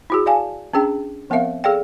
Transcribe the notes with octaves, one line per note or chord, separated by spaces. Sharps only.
E4 F#4 G#4
D5 F5 G#5 A5
C#4 D4 G#4 G5
F3 B3 C4 A#4 E5 F5
G#4 A4 D5 F5 G5